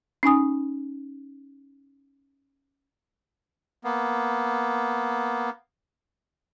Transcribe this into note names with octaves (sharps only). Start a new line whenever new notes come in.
C#4 D#4 G#5 D#6
A#3 B3